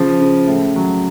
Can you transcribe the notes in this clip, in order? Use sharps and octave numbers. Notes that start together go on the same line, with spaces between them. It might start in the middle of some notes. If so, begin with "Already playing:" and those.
Already playing: C#3 F3
C#3
A2
F#3